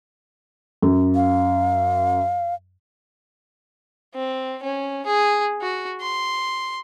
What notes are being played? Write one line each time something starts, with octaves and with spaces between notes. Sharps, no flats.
F#2
F5
C4
C#4
G#4
F#4
C6